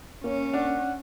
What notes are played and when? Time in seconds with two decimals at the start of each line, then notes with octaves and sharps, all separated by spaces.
0.24 A#3 C#4 C#5
0.53 D4 F#5